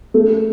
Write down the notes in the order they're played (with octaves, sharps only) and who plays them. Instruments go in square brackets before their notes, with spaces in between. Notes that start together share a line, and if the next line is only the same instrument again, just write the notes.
[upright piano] A3